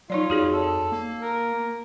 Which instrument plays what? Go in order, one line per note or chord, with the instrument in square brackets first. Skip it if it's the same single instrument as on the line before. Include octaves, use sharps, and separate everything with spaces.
[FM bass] F#3 [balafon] D#4 C#5 D5 [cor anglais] F4
[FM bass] F2 [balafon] F#4 G#4 C#5
[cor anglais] A4
[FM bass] A#3
[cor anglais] A#4